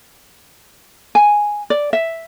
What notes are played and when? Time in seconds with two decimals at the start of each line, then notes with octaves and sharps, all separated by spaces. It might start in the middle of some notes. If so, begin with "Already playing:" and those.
1.15 G#5
1.70 D5
1.93 E5